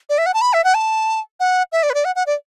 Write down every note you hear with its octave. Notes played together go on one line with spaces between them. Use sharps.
D5
E5
F#5
A5
B5
E5
F#5
A5
F#5
E5
D5
B4
D5
F#5
F#5
D5